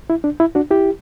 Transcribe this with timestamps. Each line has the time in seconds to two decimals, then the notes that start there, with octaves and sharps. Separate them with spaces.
0.10 E4
0.24 D4
0.40 E4
0.55 D4 F#4
0.71 E4 G4